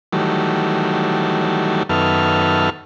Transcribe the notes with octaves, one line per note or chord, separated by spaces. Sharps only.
D#3 E3 F#3 G3 A3
F#2 D#3 B3 A4 E5 F6